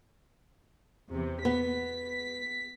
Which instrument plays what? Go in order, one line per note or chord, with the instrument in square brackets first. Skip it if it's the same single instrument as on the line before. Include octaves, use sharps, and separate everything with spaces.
[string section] E2 C3
[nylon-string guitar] B3 [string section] B6